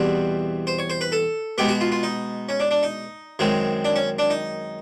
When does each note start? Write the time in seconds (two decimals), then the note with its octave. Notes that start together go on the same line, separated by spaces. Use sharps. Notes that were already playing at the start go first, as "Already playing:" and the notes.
Already playing: E2 B2 G3 C4 B4
0.67 C5
0.79 C#5
0.90 C5
1.01 B4
1.12 A4
1.58 B2 G#3 B3 G4
1.69 F#4
1.81 F4
1.92 F4
2.03 D#4
2.49 C#4
2.60 D4
2.71 D4
2.83 D#4
3.39 F#2 D#3 G#3 C4
3.85 D4
3.96 C#4
4.19 D4
4.30 D#4